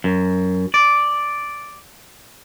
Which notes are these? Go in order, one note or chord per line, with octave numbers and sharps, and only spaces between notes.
F#2
D5